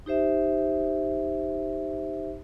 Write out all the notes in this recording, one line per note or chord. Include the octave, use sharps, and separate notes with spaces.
D#4 G4 C5 E5